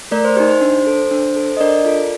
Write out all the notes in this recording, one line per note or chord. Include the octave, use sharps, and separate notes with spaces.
A3 A#4 D5
C5
D#4 G4 C5
C5
D4
A4
D4
A4
D#5
D4 A#4 D5
F4 A4